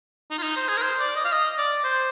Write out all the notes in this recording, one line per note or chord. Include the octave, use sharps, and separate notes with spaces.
D#4
F4
D#4
C5
G#4
A#4
C5
D5
D#5
F5
D#5
D5
C5